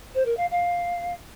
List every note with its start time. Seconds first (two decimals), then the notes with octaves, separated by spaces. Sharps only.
0.14 C5
0.25 A#4
0.36 F5
0.50 F5